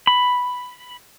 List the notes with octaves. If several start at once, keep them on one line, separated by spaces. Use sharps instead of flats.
B5